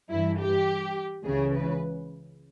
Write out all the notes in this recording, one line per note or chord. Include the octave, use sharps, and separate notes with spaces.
G2 E3 E4
G4
C#2 C#3 E3 G#4
B4